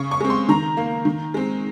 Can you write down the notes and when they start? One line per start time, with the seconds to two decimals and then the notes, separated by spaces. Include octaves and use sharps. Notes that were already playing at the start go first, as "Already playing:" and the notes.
Already playing: C#3 C#6
0.11 C#6
0.20 G#3 C4
0.30 C6
0.49 D#3 A#5
0.77 A#3
1.05 D#3
1.34 G#3 C4